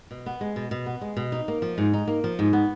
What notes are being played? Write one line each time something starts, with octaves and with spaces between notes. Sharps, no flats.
B2
B3
G#3
B2
B2
B3
G#3
B2
D#4
A#3
F3
G#2
D#4
A#3
F3
G#2
B3